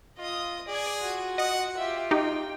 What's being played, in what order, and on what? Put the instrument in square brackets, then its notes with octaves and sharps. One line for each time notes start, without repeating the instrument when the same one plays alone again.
[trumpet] F4 [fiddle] D#5 D#6
[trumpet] G#4 [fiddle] D5 G#5
[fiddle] F4 F#4
[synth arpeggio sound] D#5 [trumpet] F#5
[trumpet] F4 [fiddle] G4 E5
[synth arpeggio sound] D#4 G4 [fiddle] G5